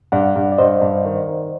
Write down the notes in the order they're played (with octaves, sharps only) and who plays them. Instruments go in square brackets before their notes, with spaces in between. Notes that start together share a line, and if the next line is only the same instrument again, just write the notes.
[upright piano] G2 [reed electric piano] D5 F#5
[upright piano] G2
[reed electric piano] D5
[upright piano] G2 [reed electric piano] C5 D#5
[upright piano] G2
D#3
D#3